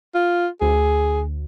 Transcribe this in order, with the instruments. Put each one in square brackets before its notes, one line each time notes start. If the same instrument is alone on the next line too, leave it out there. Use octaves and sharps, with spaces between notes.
[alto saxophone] F4
[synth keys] D2 [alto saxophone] G#4